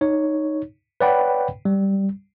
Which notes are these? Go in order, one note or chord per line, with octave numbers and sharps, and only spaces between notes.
D#4 C#5
B4 C#5 D5 F#5 G5 B5
G3